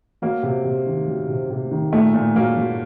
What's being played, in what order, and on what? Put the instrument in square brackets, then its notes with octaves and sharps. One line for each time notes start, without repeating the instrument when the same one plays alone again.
[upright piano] F#3 A#3
C3
C3
D#3
F#3
C3
C3
D#3
A#2 A3
A#2
F#3 A#3
F#3